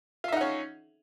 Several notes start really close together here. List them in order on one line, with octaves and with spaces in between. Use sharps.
F4 E5 D#4 F#5 C#4